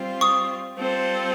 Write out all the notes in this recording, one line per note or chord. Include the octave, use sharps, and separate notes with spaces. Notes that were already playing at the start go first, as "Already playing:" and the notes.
Already playing: G3 C4 F4
C#6 D#6
G3 C4 F4 A4